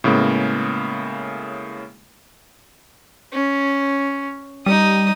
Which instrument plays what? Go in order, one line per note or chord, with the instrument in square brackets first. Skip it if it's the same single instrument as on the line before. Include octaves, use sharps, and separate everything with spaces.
[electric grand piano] A2 C#3 G#3 A#3 B3
[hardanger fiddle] C#4
[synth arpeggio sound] G3 [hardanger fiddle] D#4 D#6